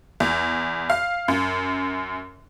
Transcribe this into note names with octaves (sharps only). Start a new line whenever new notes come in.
E2
F5
F#2